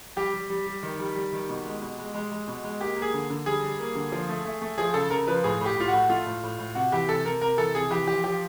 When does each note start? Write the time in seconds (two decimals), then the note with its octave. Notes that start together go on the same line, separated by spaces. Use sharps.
0.16 G3 G4
0.34 G3
0.50 G3
0.67 G3
0.83 D#3
0.99 G3
1.16 G3
1.33 D#3
1.49 B2
1.65 G#3
1.81 B2
1.99 G#3
2.14 G#3
2.32 G#3
2.48 B2
2.64 G#3
2.80 A#3 G4
2.96 A#3
3.02 G#4
3.14 D3
3.30 D3
3.46 G3 G#4
3.62 G3
3.79 A#3
3.95 D3
4.12 F3
4.29 A3
4.45 A3
4.62 A3
4.78 F3 G#4
4.94 C#3 A4
5.10 C#3 A#4
5.27 F3 B4
5.44 A2 G#4
5.61 A2 G4
5.77 A2 F4
5.88 A2 F#4
6.09 A3 F4
6.26 A2
6.43 A2
6.58 A2
6.75 C3 F#4
6.92 E3 G4
7.09 C3 A4
7.25 C3 A#4
7.42 C3 A#4
7.57 E3 A4
7.75 C3 G#4
7.90 E3 G4
8.07 F3 G4
8.24 F3 G4